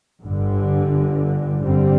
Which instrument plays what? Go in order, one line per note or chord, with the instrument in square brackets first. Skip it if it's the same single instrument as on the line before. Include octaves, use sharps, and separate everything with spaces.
[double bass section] G1 G2 D3
G2 D3 G3 C4